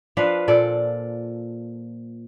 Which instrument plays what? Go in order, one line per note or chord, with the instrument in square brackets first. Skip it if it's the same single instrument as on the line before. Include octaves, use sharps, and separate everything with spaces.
[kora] F3 D4 B4 F5
A#2 A4 D5